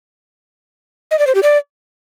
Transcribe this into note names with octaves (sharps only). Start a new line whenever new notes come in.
D#5
D5
C5
G4
D5